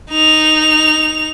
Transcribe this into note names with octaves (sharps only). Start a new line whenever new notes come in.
D#4 F7